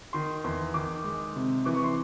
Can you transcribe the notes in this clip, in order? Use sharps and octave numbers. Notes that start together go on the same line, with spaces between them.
D#3 C6
E2 C6
D#3 D6
G#3
C3
E3 D6
C#6
C6